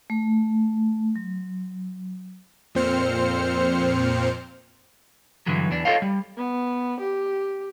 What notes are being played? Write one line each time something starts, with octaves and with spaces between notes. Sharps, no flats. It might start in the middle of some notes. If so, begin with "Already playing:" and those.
A3
F#3
F2 A#2 C4 C5 F6 C#7
G2 D3 E3 F#3
E2 E3 D4
F4 A4 C#5 D#5 F5
G3
B3
G4